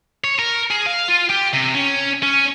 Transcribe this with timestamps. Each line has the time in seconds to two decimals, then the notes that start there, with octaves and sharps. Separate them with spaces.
0.24 C#5
0.39 A#4
0.70 G#4
0.86 F5
1.08 F4
1.29 G4
1.53 C3
1.75 C#4
2.23 C#4